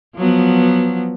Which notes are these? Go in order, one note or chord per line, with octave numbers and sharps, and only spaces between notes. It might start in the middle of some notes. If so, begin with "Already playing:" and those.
F3 F#3 B3